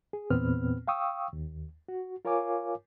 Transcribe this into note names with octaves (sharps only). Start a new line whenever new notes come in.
G#4
E2 A#2 B3 C4 B4 F6
F5 G5 C#6 D#6 E6
D#2
F#4
F4 A#4 C#5 F5 G#5 D6